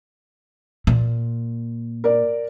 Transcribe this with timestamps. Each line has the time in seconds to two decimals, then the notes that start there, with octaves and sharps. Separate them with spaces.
0.87 A#2
2.04 A#4 D5